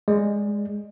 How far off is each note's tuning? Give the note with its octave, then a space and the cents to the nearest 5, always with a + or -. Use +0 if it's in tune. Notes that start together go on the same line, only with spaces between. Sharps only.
G#3 -10 D5 +0